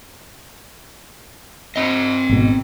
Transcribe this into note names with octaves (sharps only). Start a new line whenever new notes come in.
C4 D#5
G#1 B2